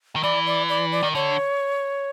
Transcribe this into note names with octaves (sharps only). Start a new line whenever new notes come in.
D#3
E3 D5
D5
D5
D5
D#3
D3 C#5